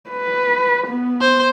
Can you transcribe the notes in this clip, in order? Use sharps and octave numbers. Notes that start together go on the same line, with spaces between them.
B4
B3
C5